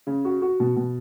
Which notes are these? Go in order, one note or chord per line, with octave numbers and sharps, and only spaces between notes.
C#3
F#4
F#4
B2
B2